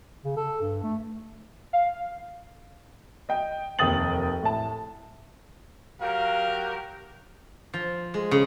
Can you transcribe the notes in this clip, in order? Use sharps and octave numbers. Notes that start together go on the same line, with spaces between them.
C#3
A4
G2
A3
F5
D#5 G5
F1 D#2 G5 D#6 A6 F#7
A2 A5
F#3 G4 A#4 F5
F3
G#3
C#3